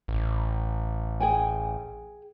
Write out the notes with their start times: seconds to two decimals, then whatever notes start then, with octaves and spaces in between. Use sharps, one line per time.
0.08 A1
1.20 G#4 G5 G#5